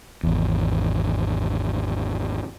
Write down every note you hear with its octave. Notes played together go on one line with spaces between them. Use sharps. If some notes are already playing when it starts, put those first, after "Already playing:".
G#1 E2